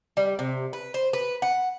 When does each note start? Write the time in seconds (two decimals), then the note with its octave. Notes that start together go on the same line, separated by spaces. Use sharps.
0.17 G3
0.39 C3
0.73 B4
0.94 C5
1.13 B4
1.42 F#5